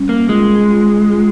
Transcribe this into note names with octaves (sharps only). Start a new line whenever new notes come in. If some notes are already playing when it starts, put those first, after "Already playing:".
Already playing: G3 C#4
A#3
G#3 F4
F4
F4